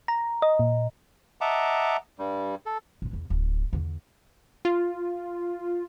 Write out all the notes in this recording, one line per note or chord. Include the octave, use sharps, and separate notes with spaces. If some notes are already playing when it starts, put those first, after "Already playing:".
A#5
D#5
A#2
D#5 E5 F#5 A5 A#5 D6
G2 G3
A4
A#2 B3
E2
D1
E2 D3
F4